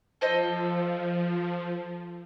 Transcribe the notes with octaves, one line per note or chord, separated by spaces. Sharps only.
F3 A4 C5 D#5